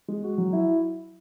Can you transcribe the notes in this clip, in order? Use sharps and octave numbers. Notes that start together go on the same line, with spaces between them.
G#3
F#4
F#3
E4